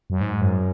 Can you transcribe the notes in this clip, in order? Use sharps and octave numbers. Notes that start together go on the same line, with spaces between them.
F#2
G#2
F#2